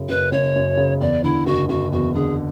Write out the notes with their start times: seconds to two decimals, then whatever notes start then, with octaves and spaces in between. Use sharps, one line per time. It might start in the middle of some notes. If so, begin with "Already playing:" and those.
Already playing: F#2 C#3
0.09 F#1 B4
0.32 F#1 C#5
0.56 F#2
0.77 C#3
1.01 E2 D5
1.24 D3 E4
1.46 F#1 F#4
1.69 F#1 F#4
1.92 E2 F#4
2.14 D3 G#4